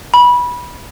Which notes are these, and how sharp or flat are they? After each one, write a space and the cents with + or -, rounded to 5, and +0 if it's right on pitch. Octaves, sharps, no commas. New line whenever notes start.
B5 -20